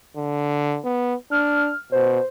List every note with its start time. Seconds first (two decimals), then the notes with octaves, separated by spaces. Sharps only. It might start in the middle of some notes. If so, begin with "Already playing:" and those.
0.17 D3
0.84 B3
1.31 D4 F6
1.92 B2 C5